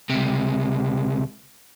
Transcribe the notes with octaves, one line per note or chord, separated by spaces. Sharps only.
C#2 C3